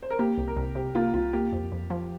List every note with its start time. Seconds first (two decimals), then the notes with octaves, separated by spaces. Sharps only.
0.02 C5
0.10 A#4
0.19 A#3 G4
0.38 C2
0.47 A#4
0.56 C2
0.75 C3 G4
0.95 A#3 F4
1.14 C2 F4
1.33 A#3 G4
1.52 F2
1.72 F2
1.90 F3